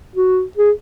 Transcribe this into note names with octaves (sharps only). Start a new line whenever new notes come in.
F#4
G#4